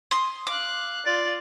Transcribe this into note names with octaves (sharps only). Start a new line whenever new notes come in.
C6 D#6
F5 D6 F#6
F4 D5